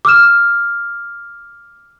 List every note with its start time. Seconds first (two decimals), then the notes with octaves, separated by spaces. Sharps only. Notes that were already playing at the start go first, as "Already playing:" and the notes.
0.05 D6 E6 F6 E7